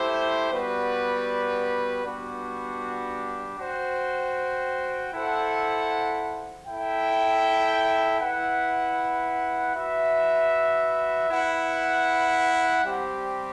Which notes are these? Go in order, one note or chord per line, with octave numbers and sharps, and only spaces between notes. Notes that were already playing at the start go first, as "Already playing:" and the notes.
Already playing: A3 E4 G4 C5 E5
G3 B3 F#4 B4 D5
G3 B3 D4 F#4
F#4 C5 G5
E4 A4 C5 F#5
E4 A4 E5 G5
E4 B4 F#5
F#4 B4 E5
E4 B4 F#5
G3 C4 G4